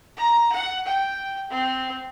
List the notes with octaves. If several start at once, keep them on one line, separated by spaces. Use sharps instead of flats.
A#5
F#5
G5
C4